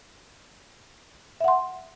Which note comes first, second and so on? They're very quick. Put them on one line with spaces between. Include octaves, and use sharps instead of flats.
E5 F#5 C6